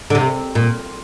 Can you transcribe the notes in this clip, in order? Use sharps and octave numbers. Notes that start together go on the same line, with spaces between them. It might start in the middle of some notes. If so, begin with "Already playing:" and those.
D3
C3
A#2